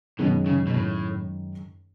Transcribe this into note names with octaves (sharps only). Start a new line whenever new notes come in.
F#2 B2 D#3 G#3 C#4
C#3
B2
A2